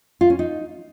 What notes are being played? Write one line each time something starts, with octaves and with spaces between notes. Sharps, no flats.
F4
C#4
D#4